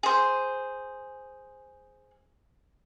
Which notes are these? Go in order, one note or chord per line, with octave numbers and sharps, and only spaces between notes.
G#4 C5